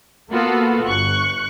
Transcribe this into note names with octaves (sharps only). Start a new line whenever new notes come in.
A#3 B3 F4 F#4 A4
G1 C#6 F#6